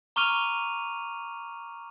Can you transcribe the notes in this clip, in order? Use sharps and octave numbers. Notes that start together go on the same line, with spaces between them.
A#5 C#6 D6 F6 D#7 F7